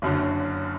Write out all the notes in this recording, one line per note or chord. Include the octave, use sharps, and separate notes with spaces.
F#1 F#2 D3